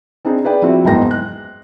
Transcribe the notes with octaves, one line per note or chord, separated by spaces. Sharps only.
C4 D4 D#4 G#4
G#4 B4 D5 G5
F3 C4 E4 F#4
F#1 E2 G#2 G5 A#6
F#6